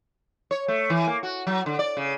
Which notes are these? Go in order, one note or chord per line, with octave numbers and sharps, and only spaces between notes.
C#5
A3
E3
A#3
F#4
F#3
D3
D5
C#3